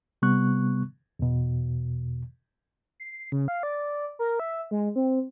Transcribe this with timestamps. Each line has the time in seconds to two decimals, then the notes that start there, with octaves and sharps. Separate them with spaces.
0.22 C3 G3 B3 C#6 F#6
1.19 E2 B2
3.00 C7
3.32 C#3
3.48 F5
3.63 D5
4.19 A#4
4.40 E5
4.71 G#3
4.96 C4